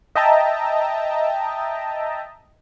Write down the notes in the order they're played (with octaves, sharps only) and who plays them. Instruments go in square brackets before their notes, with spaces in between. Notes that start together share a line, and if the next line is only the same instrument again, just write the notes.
[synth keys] D#5 E5 G5 A5 A#5